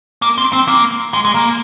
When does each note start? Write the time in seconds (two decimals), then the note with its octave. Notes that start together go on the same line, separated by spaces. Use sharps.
0.22 A#3
0.38 C4
0.53 C4
0.68 A#3
1.14 G#3
1.25 G#3
1.35 A#3